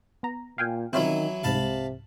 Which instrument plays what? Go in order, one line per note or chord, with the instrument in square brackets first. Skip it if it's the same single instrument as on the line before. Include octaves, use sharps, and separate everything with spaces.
[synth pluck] B3 A#5
[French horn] A#2 [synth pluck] F5 G5 G#5
[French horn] D#3 [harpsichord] E3 F#3 E4 [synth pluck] C4 C#4 F4
[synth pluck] C2 G#2 [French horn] C3 [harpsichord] F5 A5 B5